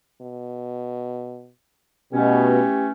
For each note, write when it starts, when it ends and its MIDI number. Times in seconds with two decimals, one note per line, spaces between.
0.21 1.51 47
2.13 2.61 47
2.13 2.92 52
2.13 2.92 57
2.13 2.92 61
2.13 2.87 67